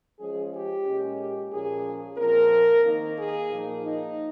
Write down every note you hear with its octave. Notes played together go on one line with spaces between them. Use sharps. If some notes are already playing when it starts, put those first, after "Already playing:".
F3 G#3 C#4 G#4
G4
A#2 G#3 C#4
G4
A#2 F3 A#3 C#4 G#4
A#2 F3 C4 A#4
D#3 A#3 D#4
G#4
A#2 F3 A#3 D#4
D#4